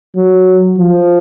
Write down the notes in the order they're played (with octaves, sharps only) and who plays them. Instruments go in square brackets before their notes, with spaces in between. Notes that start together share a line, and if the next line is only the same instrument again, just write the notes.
[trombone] F#3
F3